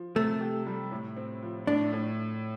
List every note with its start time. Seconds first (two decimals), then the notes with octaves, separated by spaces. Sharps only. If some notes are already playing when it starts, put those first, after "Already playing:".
Already playing: F3
0.16 C3 A3
0.41 G4
0.67 G3
0.92 A2
1.16 C4
1.43 F3
1.67 A2 D4
1.93 A2